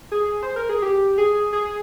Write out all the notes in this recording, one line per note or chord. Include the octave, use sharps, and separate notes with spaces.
G#4
C5
A#4
G#4
G4
G#4
G#4